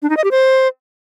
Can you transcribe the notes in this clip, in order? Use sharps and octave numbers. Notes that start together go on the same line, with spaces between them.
D4
D#4
D#5
G4
C5